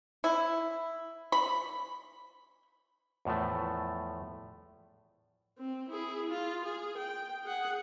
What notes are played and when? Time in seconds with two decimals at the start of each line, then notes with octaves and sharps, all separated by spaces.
0.24 E4
1.32 B5
3.25 E2 A2 F3 A3
5.59 C4
5.89 E4 G#4
6.30 F4
6.65 G#4
6.97 G5
7.45 G#4 F#5